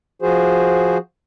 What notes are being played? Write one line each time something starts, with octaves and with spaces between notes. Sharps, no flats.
F3 F#4 G#4 C5